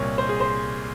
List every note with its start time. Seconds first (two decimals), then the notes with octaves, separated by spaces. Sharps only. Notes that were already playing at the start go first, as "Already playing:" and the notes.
Already playing: C2 A#2 C#5
0.18 C5
0.29 G#4
0.40 C5